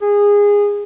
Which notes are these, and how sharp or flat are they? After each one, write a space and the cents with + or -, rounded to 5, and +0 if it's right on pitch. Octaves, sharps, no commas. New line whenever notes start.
G#4 -20